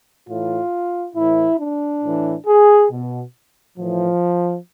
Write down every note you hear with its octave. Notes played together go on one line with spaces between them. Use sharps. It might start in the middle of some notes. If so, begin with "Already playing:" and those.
A2 E3 F4
A2 E3 E4
D4
A2 E3
G#4
B2
A2 E3 F3